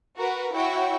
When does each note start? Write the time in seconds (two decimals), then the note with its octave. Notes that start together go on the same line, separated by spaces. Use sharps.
0.17 F#4 A#4 B4
0.54 E4 F#4 C#5 G5